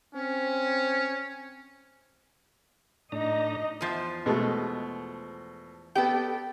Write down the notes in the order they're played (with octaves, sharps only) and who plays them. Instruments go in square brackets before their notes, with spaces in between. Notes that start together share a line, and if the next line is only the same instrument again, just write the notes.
[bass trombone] C4 [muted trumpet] C#4
[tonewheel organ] A2 D4 A#5 [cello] D#4
[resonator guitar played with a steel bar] E2 F3 C5
[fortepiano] B2 G#3 A3
[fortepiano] B3 G4 [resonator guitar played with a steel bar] A4 D5 G5